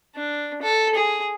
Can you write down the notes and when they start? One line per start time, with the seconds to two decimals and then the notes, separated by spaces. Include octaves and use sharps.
0.15 D4
0.62 A4
0.95 G#4